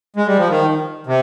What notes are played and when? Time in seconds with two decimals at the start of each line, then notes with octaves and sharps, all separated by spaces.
0.16 G#3
0.27 G3
0.37 F3
0.48 D#3
1.07 C3